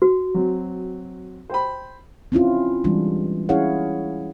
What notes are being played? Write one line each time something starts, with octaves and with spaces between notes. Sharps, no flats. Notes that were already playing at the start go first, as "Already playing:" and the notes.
F#4
F#3 C4
C5 G5 B5
C4 C#4 E4 F4
E3 G3 G#3 D4
C#4 E4 G#4 C#5 F5 F#5